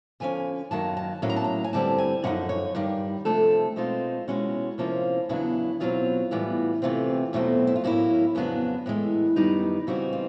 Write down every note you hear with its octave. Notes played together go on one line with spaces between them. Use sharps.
D3 F3 G#3 C#4 G#5
F#2 D#3 F#3 A#3 A5
A5
A2 F#3 A#3 C#4
A#5
A5
A#5
G#5
G2 D3 G3 C4 E4 A5
G#5
F#2 D3 F3 D#4 F#5
C#5
G2 D#3 G3
C3 F3 A3 D4 A4
B2 G#3 C4 D#4 F4
B2 G#3 C#4 E4 F#4
C3 F3 A#3 C#4 E4 F4
E2 C#3 F#3 B3 D4 E4
E2 B2 F#3 A3 C4 F4
A2 E3 G3 B3
C3 E3 A3 C4 F4
E2 B2 F#3 A3 C4
E4
F4
A2 F#3 A#3 C#4 E4 F#4
F2 C#3 F#3 B3 D4
A2 E3 G#3
F#2 D#3 G3 B3 D#4
C#3 E3 G3 C4 D#4 F#4
F4